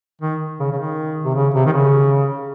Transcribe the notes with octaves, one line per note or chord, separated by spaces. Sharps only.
D#3
C#3
C#3
D#3
C3
C#3
C3
D#3
C#3